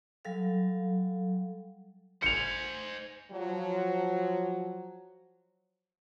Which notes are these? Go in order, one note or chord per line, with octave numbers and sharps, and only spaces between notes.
F#3 G3 A4 F5
C5 G#5 C#7 F7
F3 F#3